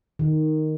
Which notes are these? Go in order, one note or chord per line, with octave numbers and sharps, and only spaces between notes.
D#3